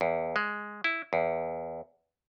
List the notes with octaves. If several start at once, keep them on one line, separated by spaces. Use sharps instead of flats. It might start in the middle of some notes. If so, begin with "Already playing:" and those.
E2
G#3
E4
E2